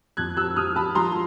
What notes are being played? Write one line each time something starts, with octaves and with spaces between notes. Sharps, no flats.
F2 F#6 G#6
E6 F#6
F2 D#6 F6
A5 B5
F3 A#5 C6